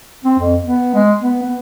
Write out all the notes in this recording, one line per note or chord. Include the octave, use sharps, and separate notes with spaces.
C4
F2
B3
G#3
B3
B3